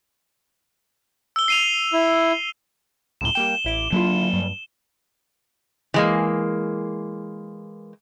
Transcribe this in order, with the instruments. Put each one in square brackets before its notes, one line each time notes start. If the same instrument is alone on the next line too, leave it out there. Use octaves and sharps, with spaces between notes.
[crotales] E6 G7
C7 D#7 F7
[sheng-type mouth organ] E4
[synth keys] C#2 F#2 A2 [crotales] E7 G7
[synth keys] G3 A#3 G5 [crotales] E7
[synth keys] A1 E4 D6
[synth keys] D3 E4 F4 [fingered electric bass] F#3 A#3
[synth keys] G2
[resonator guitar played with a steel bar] E3 G#3 A#3